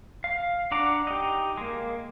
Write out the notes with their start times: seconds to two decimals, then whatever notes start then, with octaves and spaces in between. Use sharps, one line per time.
0.24 F5
0.71 D4 D5 F#5 A#5 D6
1.07 D#4 G4
1.57 G#3 A#3